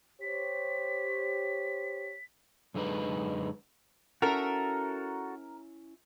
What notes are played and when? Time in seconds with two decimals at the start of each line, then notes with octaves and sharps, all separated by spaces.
0.21 G4 C5 C#5 B6
2.74 F#2 D3 G#3 D#4 B4
4.22 C#4 E4 F#4 A4 A#4 E5